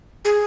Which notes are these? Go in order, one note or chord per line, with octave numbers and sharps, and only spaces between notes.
G#4